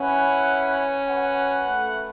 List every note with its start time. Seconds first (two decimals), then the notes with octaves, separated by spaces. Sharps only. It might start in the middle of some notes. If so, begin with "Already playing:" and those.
Already playing: C#4 E4 B4 F#5
1.08 F#4 B4 F#5
1.67 A3